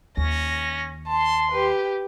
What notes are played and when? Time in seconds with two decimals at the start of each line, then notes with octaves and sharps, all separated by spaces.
0.17 D#2 C#4 A#6
1.07 A5 C6
1.51 G4 B4